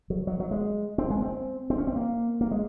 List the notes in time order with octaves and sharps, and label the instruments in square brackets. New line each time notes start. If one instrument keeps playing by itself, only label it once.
[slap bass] F#3
F#3
F#3
G#3
C4
G#3
C4
C4
C#4
C4
A#3
A#3
G#3